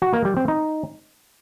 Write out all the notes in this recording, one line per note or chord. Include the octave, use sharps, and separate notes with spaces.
F#4
A#3
G3
C4
D#4